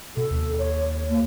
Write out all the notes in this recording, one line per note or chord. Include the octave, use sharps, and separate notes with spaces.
B2 A4
D#2
C#5
A#3